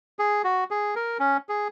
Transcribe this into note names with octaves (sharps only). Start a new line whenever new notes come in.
G#4
F#4
G#4
A#4
C#4
G#4